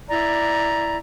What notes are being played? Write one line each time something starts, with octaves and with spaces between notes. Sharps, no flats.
E4 D5 A#5